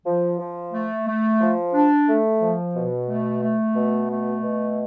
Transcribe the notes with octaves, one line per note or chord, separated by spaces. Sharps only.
F3
F3
A3
A3
F3
D4
A3
F3
B2
A3
A3
B2
A3
B2